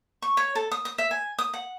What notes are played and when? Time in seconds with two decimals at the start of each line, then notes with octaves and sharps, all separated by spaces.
0.22 C#6
0.37 C#5
0.55 A4
0.71 D#6
0.85 D#6
0.98 E5
1.11 G#5
1.39 D#6
1.54 F#5